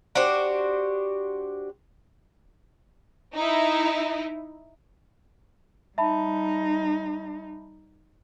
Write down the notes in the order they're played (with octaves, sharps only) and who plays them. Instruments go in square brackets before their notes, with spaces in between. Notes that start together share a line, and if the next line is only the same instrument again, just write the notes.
[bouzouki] D4 F#4 G4 C5
[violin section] D#4 E4
[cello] G3 D#4 [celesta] E5 A5 B5